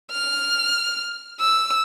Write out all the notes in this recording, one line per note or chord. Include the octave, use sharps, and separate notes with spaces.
F6
E6